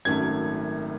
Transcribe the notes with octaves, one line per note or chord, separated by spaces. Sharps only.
G#1 F#2 D#3 F#3 A3 G#6